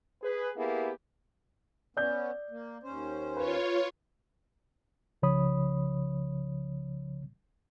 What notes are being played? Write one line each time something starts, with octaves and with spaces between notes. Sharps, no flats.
G#4 B4
A#3 B3 E4 G4 G#4
B3 C#4 D5 G6
A#3
D#2 C#4 C5
F4 B4 C#5
C2 C#3 F3 C#5 B5 D#6